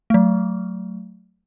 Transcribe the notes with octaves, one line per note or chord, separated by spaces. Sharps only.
F#3 A3